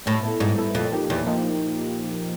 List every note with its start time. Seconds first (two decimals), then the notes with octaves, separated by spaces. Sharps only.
0.06 A2 G3
0.23 B3 E4 A4
0.40 G#2 G3
0.58 B3 E4 A4
0.75 F2 A#2
0.92 F3 A#3 D#4 G4
1.09 E2 A#2
1.27 F3 A#3 D#4 G4